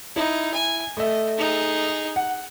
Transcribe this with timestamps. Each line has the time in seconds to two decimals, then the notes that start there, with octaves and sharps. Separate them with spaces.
0.16 D#4 E4
0.54 G#5
0.97 A3 D#5 E5
1.38 D#4 G#4
2.16 F#5